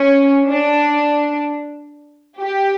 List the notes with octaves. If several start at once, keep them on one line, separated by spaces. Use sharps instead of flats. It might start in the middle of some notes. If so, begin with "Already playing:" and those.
Already playing: C#4
D4
G4